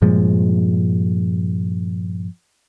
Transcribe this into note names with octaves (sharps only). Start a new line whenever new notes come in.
G2 A#2 F3 G#3